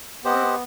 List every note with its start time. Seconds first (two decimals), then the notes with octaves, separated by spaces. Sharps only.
0.24 B3 G4 C5 D#5 F#5
0.34 C4
0.42 B3